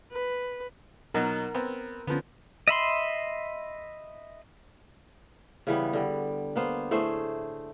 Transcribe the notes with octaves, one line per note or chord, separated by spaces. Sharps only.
B4
B2 F#3 D#4 A#4
B3 C4
D3 F3 B3 C#4
D#5 E5 B5 C6
C#3 E3 G3 B3
D3 G3
A#3 B3 C5
A2 A3 G#4 C5